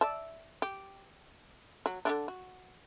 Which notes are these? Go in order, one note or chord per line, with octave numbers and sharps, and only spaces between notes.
D5 E5 A5
G4
F#3
D3 D#3 D4
F#4